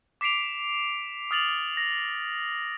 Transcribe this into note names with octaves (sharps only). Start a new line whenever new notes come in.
D6 B6 C7 D7 F7
D#6 F6 A6 F7 F#7
A#6